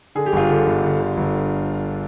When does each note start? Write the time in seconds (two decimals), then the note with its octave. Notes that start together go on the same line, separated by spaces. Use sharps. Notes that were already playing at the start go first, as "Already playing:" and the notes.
0.15 D3 G#4
0.26 G4
0.32 G1 F4 G#4
0.50 D3
0.66 G1
0.83 D3
1.00 D3
1.17 G1